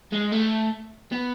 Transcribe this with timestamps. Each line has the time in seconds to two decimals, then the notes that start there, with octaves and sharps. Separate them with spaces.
0.13 G#3
0.32 A3
1.12 B3